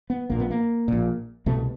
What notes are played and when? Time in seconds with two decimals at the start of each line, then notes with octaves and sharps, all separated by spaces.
0.10 B3
0.30 A#1 A#2 A#3
0.40 B3
0.51 A#3
0.88 A#1 A#2
1.46 C2 B2 A3